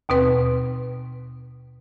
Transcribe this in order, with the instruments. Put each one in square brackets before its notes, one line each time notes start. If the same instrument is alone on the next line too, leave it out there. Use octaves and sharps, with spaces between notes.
[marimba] D#2 B2 C4 B4